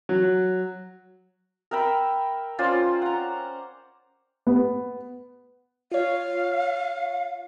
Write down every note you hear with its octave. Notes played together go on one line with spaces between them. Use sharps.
F#3
A#4 E5 G5 B5
C#4 F4 C5 D5
F#5 A#5
B3
F4 C#5 F5